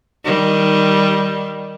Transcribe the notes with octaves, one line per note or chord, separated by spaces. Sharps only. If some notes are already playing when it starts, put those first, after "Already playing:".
D#3 G3